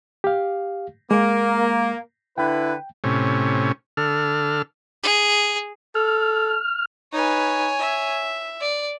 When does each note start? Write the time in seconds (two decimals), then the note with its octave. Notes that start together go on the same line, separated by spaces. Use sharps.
0.24 G4 F5
1.11 G#3 A#3
2.38 D3 E4 B4 G5
3.04 A2 C3 C#4
3.97 D3 A4 F6
5.03 G#4
5.95 A4 F6
7.12 D#4 B4 C#5 G#5
7.79 E5
8.61 D5